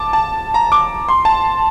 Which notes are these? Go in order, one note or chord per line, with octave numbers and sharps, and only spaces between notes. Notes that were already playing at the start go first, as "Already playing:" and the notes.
Already playing: A5 D6
A5
A#5
D6
C6
A5